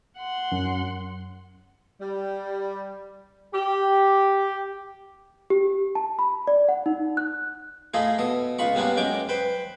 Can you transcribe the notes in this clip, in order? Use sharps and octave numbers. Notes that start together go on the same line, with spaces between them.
F#5 C6
F#2
G3
G4
G4
A5
B5
D5
F#5
D#4
F#6
A3 E4 F4 G#4 D#5
B2 A4 D#6
C#2 F4 B5 C#6
G3 A#3 B3 C#4 D4 F4
F#2 G#3 C#4 G5 D6
B4 C5 G5